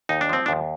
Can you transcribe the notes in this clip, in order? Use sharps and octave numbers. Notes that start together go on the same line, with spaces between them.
D#2 D#4
D4
F3 C4
D4
D#2